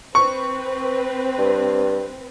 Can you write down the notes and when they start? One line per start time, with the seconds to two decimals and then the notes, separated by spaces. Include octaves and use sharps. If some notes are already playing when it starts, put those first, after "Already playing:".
0.15 C4 B4 C#6
1.38 G2